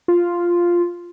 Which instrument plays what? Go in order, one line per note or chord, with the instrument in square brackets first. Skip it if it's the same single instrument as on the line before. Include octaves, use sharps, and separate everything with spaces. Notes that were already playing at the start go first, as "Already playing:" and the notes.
[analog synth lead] F4